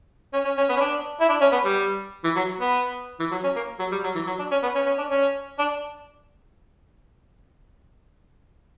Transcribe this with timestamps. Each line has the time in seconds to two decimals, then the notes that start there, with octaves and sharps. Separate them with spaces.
0.33 C#4
0.45 C#4
0.57 C#4
0.69 B3
0.77 C#4
0.80 D4
1.20 E4
1.29 D4
1.41 C#4
1.52 B3
1.65 G3
2.24 E3
2.36 F#3
2.60 B3
3.20 E3
3.31 F#3
3.44 C#4
3.56 A#3
3.79 F#3
3.92 G3
4.04 F#3
4.15 E3
4.27 F#3
4.39 D4
4.51 C#4
4.63 B3
4.75 C#4
4.86 C#4
4.98 D4
5.10 C#4
5.59 D4